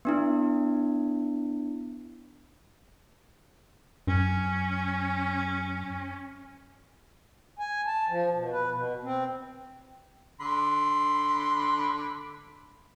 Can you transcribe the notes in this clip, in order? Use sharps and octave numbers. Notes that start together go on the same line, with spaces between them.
B3 D4 E4
F#2 C#4
G#5
A5
F3
B2
B4
B2
C4
D3 B5 C6